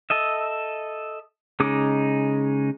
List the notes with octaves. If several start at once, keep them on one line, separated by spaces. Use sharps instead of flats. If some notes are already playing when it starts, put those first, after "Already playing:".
A4 D#5 E5
C#3 G#3 D#4 D6